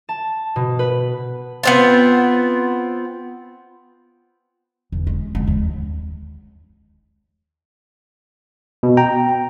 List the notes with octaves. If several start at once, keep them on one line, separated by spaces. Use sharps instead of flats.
A5
B2
B4
B3 C4 F4
E2
G#3
G#3
D#2
B2
G5 A#5